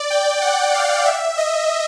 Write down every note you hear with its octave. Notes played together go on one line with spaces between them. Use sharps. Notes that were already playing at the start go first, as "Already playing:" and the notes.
Already playing: D5
G5
F#5
F5
E5
D#5